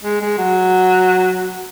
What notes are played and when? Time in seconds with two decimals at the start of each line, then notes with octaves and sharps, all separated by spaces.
0.04 G#3
0.21 G#3
0.38 F#3